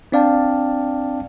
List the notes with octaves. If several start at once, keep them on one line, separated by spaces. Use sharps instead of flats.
C4 D4 D5 F5 G5 A5